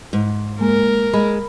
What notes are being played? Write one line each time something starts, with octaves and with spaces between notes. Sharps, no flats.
G#2
G#3 A#3 A#4
G#3 B5